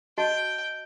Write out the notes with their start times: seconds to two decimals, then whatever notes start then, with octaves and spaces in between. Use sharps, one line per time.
0.18 F#4 D#5 G5 A5